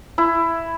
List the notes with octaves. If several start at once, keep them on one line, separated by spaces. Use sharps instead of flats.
E4